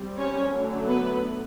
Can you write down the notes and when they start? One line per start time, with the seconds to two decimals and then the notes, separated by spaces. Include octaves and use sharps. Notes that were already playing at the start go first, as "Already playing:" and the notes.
Already playing: G3 C4
0.17 C#4 C#5
0.52 D3 F#3 A3
0.87 B3 B4